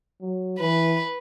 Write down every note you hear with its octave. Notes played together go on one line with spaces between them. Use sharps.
F#3
E3 B4